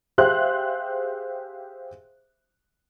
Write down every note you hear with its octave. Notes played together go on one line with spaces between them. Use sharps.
G4 G#4 C5 E5 F5 F#6